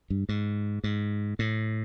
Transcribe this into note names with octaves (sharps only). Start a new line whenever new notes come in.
G2
G#2
G#2
A2